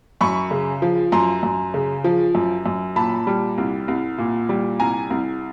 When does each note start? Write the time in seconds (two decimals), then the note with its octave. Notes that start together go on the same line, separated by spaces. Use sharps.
0.21 F#2 B5 C#6
0.51 C#3
0.82 F3
1.12 F#2 A#5 C6
1.43 F#2
1.74 C#3
2.04 F3
2.35 F#2
2.66 F#2
2.96 A#2 A5 B5
3.27 G3
3.58 C2
3.88 C2
4.18 A#2
4.49 G3
4.80 C2 G#5 A#5
5.10 C2